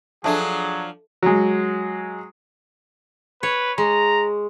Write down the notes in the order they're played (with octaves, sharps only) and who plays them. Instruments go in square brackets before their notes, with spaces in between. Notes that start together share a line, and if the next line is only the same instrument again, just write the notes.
[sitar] F3 D4 [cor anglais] F#3 [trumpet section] G#4 [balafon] A4 E5 A5
[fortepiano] F#3 G#3
[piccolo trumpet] B4 [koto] C#5
[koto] G#3 [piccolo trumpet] A#5